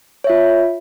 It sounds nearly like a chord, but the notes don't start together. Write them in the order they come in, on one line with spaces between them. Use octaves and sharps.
C#5 E5 F4